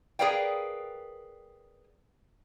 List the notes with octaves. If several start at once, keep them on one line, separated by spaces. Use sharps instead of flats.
G#4 A#4 B4 D5 F5 G5